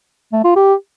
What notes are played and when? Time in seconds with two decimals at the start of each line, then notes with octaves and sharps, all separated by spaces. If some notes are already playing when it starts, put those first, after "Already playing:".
0.33 A3
0.44 F4
0.56 G4